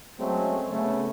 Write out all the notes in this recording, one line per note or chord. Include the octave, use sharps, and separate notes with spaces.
F#3 G#3 A3 C4 C#4
C#3 A3 B3 C#4